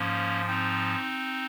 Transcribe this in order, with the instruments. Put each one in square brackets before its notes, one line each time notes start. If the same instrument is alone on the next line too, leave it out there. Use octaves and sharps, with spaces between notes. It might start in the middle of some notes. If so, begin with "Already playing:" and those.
Already playing: [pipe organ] G#2 F3 A#3 C#4
C4 D#4